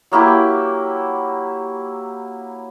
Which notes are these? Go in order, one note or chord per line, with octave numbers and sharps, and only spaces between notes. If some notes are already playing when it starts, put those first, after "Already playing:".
F#3 A#3 E4 G4